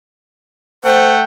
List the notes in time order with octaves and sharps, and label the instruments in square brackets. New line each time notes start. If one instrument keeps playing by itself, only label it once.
[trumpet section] A3 F#5 G5 [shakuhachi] C5